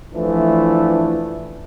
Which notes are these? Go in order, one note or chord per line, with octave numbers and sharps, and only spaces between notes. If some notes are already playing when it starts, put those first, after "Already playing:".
E3 F3 A3 D4